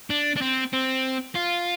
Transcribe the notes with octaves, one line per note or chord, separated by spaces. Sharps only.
D4
D4
C4
C4
F4